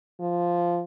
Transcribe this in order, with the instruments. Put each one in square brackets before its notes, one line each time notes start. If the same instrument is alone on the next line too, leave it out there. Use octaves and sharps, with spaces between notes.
[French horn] F3